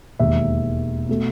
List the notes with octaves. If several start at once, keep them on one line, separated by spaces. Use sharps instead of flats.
E1 D#2 D#3 G#3 E5
B2 A3